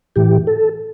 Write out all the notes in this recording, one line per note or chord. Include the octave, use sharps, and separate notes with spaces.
A2 E3 G4
A4